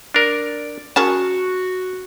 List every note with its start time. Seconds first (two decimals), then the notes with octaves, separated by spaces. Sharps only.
0.14 D4 A#4 D5
0.96 C#4 F#4 G#4 A#4 A5